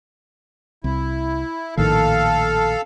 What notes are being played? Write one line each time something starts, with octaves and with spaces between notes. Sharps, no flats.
C2 E4
A#1 A2 D#3 A4 F5